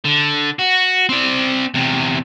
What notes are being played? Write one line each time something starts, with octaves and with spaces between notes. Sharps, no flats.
D3
F#4
C4 D5
E2 C3